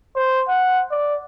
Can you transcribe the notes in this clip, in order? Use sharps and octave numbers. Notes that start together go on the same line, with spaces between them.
C5
F#5
D5